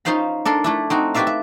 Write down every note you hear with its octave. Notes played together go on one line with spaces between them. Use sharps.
C#4 D#4 F4 C5 F5 B5
D4 A4 A#4 C6
A3 D4 E4
C4 D#4 F#4
F#4 G4 B4 D5 E5 F5
E5